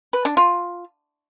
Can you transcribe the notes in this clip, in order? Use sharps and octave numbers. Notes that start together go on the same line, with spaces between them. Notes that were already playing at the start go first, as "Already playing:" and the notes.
B4
D4
F4